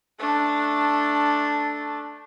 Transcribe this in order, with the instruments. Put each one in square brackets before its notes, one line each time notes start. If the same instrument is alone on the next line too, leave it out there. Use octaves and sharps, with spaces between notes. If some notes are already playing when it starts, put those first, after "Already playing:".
[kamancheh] A3 D4